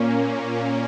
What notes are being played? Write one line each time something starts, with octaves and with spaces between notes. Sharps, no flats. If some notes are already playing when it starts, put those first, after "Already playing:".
Already playing: A#2 A#3 C#4